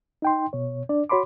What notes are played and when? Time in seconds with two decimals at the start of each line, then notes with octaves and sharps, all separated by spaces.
0.22 D#4 G5 C6
0.53 B2 C#5
0.89 D4 D5
1.09 F#4 C#5 B5 C6 D6